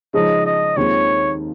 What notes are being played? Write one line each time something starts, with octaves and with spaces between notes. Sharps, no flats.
C#3 F3 G#3 D#4 D#5
D#5
D#2 D#3 G#3 C4 F4 C#5